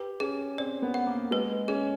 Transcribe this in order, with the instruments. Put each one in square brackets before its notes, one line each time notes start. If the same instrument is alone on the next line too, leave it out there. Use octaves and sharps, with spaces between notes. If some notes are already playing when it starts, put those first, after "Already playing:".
Already playing: [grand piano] G4 [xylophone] B4
[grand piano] C#4 [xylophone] G#4
[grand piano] C4 [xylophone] D5
[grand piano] B3
[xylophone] F#5
[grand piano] A#3
[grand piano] G#3 [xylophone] B4
[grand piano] C#4 [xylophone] G#4